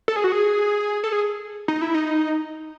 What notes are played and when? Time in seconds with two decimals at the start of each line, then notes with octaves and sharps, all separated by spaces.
0.08 A4
0.16 G#4
0.24 F#4
0.32 G#4
1.04 A4
1.12 G#4
1.68 D#4
1.82 E4
1.95 D#4